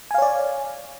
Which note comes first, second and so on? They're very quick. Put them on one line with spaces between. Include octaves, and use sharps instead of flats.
G#5 F5 C#5 D5